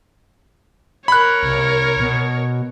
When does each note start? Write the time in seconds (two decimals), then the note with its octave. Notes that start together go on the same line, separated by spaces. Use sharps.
1.08 A#4 C#5 B5 F#6
1.43 C2
2.00 B2